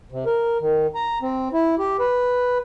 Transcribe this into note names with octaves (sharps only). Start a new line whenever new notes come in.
C3
A#4
D#3
A#5
C4
E4
G4
B4